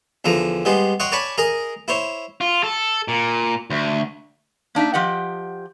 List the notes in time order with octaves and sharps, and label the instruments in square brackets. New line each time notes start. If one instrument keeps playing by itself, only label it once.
[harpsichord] E2 D3 F3 A#5
G3 G#3 B3 C5
C#5 D#5 F#5 G5 C6
C#5 D5 G#5 A5 B5 C#6
G#4 A#4 D#5 A#5
E4 C5 C#5
[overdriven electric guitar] F4
A4
A#2
D2
[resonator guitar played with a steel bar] A#3 D4 D#4 E5
F3 G4 D#5 F#5